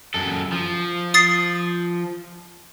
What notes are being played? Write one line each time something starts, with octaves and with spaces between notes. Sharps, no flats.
F#2 A4
F3
D#6 A6 C7